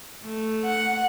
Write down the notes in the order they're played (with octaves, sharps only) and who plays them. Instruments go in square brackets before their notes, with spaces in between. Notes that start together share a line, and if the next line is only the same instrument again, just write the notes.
[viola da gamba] A3
[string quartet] F#5